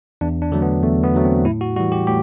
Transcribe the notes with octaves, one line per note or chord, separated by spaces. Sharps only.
E2 D4
D4
D3 F#3 A3
B3
E2 A3
B3
D3 F#3 A3
C4
A2 E4
F#4
E3 G3 F#4
G4
A2 G4